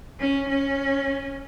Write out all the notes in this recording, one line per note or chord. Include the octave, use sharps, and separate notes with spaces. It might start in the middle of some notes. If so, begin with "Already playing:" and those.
C#4
C#4